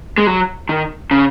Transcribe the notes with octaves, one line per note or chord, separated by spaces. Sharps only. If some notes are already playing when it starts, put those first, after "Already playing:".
G#3
F#3
D#3
C#3